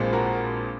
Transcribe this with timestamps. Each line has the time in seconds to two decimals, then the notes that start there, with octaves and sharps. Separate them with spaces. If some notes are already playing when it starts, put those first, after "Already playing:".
Already playing: A#1 A#2 G#3 C4
0.13 F#4 A#4